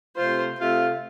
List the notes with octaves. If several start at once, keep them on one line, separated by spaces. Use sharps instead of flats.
C3 A3 F4 C5
C3 A3 F4